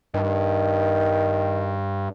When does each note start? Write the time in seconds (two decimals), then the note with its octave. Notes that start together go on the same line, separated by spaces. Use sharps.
0.14 G2 D#3